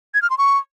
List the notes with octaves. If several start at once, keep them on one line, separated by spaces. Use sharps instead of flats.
G#6
F6
C6
C#6